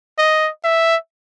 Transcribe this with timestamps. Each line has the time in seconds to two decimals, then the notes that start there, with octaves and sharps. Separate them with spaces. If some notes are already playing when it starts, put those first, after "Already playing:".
0.18 D#5
0.64 E5